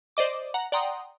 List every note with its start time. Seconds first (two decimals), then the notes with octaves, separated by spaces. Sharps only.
0.17 C5 D5 D#5 D6
0.54 F#5 A#5
0.72 D5 F#5 G5 A#5 C6 D#6